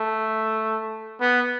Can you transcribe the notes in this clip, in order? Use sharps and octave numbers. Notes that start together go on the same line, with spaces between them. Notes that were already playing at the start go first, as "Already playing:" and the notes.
Already playing: A3
B3